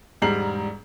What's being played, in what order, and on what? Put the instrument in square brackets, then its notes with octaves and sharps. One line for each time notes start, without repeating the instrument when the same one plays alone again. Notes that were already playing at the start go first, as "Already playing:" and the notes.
[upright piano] E1 G#2 G3 A#5 C7 F#7